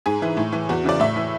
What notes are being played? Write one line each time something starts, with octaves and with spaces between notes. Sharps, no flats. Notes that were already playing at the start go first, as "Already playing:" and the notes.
G#2 G#4
E3
A2
E3
E2 F#4
C#3 E3 D5
A2 E5
E3